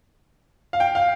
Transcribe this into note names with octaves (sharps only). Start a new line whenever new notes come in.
F5
G5
F5